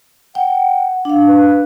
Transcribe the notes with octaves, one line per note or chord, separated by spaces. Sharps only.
F#5 G5
D4 F5
B4